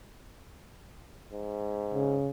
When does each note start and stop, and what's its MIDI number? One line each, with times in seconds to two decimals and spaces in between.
1.33 2.17 44
1.94 2.30 49